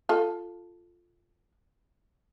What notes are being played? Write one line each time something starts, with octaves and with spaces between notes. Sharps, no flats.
F4 A4